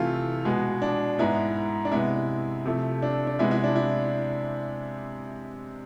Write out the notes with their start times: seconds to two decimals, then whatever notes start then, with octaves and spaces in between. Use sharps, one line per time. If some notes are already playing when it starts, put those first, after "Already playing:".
Already playing: C3 E3 A3 F4
0.45 B2 G#3 B3
0.82 D4
1.18 G#2 G#3 B3 E4
1.85 D4
1.92 C3 G#3 B3 E4
2.65 C3 F3 A3
3.02 D4
3.27 D4
3.39 C3 G#3 B3 E4
3.51 E4
3.64 D4
3.76 E4